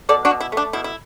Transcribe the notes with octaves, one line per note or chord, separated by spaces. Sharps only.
B2 A4 D5
D4 F#4
B2
E4
A3 D4
B2 E4
E4